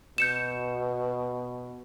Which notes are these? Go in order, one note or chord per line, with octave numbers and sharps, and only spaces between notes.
B2 G6 C#7 E7